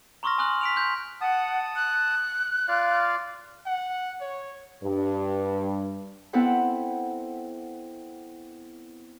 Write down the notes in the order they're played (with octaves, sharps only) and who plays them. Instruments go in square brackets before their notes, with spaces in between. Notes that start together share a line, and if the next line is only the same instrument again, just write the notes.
[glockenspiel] A#5 C6 C#6 D#6 F6 A#6
G#5 C#6 D#6 F6 F#6 F#7
B6 D7 F7
C6 F#6 G6
[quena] F#5 [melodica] A5 D#6
[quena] F#6
[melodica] F4 D5 F5
[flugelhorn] F#5
C#5
[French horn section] G2
[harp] B3 C4 E4 A4 F#5 B5